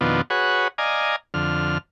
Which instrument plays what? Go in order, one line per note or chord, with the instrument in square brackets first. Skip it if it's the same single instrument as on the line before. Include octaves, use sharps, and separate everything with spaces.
[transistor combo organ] F2 B2 D#3 B3 D4 F4
F#4 G#4 B4 C#5 F#5
D5 D#5 F5 G#5 A#5
F2 D3 F6